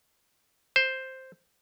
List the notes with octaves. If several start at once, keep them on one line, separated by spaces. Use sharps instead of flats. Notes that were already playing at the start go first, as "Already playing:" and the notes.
C5